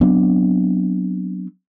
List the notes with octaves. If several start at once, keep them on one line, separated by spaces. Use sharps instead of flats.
F#3 B3 C4 D4